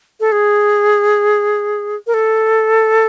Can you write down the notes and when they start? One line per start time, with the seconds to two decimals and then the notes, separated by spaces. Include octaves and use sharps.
0.20 A4
0.32 G#4
2.07 A#4
2.14 A4